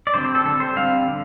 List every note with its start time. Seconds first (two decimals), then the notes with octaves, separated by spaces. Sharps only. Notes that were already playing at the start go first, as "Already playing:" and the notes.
0.07 D5
0.14 D3 G3 C4 C5
0.24 C5
0.35 A4
0.45 D3 G3 C4 A4
0.60 C5
0.76 D3 G3 C4 F5
1.08 D3